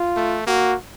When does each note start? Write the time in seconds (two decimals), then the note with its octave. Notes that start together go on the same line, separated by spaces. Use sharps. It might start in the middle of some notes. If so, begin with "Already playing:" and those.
Already playing: F4
0.16 A3
0.47 A#3 F#4